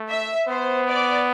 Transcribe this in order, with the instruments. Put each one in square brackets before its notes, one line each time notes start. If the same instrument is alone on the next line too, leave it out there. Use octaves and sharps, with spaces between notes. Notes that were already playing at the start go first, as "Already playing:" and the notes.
Already playing: [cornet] A3
[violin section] E5
[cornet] B3 [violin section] C5
[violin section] D5